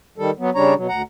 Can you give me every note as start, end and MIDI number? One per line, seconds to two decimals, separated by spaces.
0.18 0.31 51
0.18 0.31 55
0.18 0.31 69
0.39 0.50 54
0.39 0.50 59
0.55 0.74 49
0.55 0.74 55
0.55 0.74 62
0.55 0.74 73
0.55 0.74 82
0.76 0.87 47
0.76 0.87 54
0.89 1.02 38
0.89 1.02 78
0.89 1.02 82